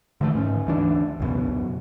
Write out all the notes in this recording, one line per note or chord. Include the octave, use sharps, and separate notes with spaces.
D3 E3 G#3 A3
G#2 C#4
D2 E3 D4
C#2 F#2 B2